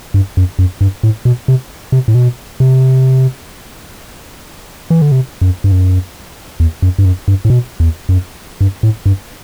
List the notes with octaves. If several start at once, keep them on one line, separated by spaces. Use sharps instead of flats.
G2
F#2
F#2
G2
A2
B2
C3
C3
A2
B2
C3
E3
D3
C3
F#2
G2
F#2
E2
F#2
G2
F#2
G2
A2
B2
E2
F#2
G2
A2
G2